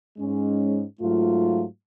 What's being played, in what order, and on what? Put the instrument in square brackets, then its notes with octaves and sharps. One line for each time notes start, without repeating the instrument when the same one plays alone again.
[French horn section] G#2 G#3 C#4
G#2 F#3 A3 F4